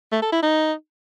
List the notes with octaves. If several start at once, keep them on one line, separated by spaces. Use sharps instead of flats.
A3
A4
E4
D#4